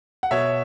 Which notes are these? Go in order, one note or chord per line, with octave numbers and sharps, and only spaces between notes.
F#5
B2 C#5 E5